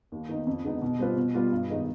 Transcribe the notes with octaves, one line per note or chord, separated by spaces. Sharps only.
D#2
D#3 B3 D#4
F2
D3 G#3 B3 D#4
B2
G3 C4 F4 B4
B2
G3 B3 F4 B4
G2
D#3 G#3 B3 D#4